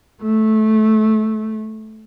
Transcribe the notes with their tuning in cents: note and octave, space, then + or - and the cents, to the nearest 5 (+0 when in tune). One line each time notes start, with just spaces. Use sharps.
A3 -15